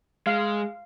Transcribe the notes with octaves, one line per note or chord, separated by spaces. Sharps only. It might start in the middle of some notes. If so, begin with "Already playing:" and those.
G#3 F5